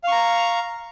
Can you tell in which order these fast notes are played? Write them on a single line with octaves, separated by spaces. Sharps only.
F5 C#6 A#5